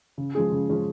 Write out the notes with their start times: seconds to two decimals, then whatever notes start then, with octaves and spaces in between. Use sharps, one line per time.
0.18 C#3
0.35 F3 G#3 C#4 G#4
0.52 C#3
0.69 F3 G#3 C#4 G#4